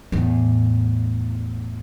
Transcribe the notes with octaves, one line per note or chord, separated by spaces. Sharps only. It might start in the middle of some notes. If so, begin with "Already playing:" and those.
E2 A2